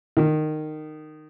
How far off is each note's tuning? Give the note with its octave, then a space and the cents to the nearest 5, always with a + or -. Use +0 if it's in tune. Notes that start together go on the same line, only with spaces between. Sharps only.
D#3 -15